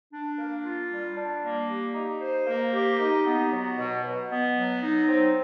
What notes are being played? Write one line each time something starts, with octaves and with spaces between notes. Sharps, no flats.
D4
A#3
F4
G3
D4
A#3
G4
D#4
C5
A#3
G4
D#4
B3
F#3
B2
B2
B3
F#3
D#4
C4